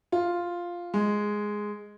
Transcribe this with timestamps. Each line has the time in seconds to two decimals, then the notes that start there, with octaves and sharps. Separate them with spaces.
0.12 F4
0.94 G#3